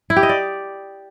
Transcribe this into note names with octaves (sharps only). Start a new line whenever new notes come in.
E4
G4
D#5
D5